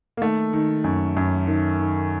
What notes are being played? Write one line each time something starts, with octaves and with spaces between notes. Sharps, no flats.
A#3
D#3 A3
D#3
F#2
F#2
D#3
D#3